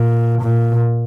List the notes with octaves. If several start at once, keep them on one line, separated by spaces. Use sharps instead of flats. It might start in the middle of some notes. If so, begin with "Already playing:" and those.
Already playing: A#2
A#2